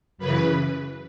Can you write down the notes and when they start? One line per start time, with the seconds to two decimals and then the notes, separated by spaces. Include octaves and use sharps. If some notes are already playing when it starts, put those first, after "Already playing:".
0.18 F#2 C#3 E3 B4